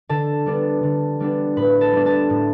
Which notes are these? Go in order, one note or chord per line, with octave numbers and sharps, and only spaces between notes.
D3 A4 A5
G3 B3 D4
D3
G3 B3 D4
A2 B4 B5
A4 A5
G3 B3 D4
A4 A5
A2